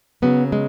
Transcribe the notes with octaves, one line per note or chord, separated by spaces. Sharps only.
C#3 F#3 B3
G#3